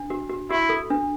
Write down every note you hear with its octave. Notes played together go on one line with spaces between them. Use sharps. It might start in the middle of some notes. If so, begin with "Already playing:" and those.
Already playing: D4
F#4
F#4
E4 F#4
A4
D4